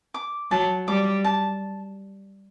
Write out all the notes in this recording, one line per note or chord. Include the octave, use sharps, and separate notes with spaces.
D6
F#3 A5
G3 D6
A5